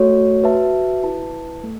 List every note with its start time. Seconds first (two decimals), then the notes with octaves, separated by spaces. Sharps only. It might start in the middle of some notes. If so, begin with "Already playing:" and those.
Already playing: A3 F#4 C#5
0.43 F#4 B4 E5 A5
1.03 E4 B4 A5
1.63 A3